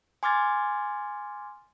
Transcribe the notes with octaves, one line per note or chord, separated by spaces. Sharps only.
G#5 C6 D6 F6 G#6 A6